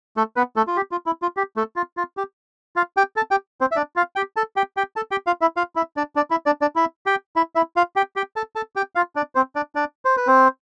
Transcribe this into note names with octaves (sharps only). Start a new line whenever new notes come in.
A3 A4
B3 B4
A3 A4
F4
G4
F4
E4
F4
G4
A3 A4
F4
F4
G4
F4 F5
G4 G5
A4 A5
G4 G5
C4 C5
E5
D4 D5
F4 F5
G4 G5
A4 A5
G4 G5
G4 G5
A4 A5
G4 G5
F4 F5
E4 E5
F4 F5
E4 E5
D4 D5
D4 D5
E4 E5
D4 D5
D4 D5
E4 E5
G4 G5
E4 E5
E4 E5
F4 F5
G4 G5
G4 G5
A4 A5
A4 A5
G4 G5
F4 F5
D4 D5
C4 C5
D4 D5
D4 D5
C5
B4
C4 C5